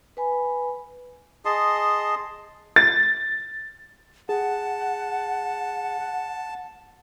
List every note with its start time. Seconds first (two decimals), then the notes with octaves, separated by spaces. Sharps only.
0.17 B4 G#5 B5
1.45 G#4 D#5 A5 C6
2.76 A6
4.29 G#4 F#5 A5